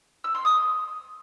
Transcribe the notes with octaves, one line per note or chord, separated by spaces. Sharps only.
E6
C6
D#6